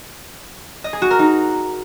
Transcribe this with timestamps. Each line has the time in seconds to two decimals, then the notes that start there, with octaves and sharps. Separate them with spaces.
0.84 D#5
0.93 G#4
1.02 F#4
1.10 A#4
1.19 D#4